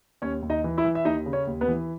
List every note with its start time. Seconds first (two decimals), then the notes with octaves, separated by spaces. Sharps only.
0.22 D#2 C#4 C#5
0.42 D#2
0.50 D#4 D#5
0.64 E3
0.78 E4 E5
0.84 E3
0.95 E5
1.05 D#2 D#4 D#5
1.26 C#3
1.33 C#4 C#5
1.47 D#2
1.61 B3 B4
1.68 E3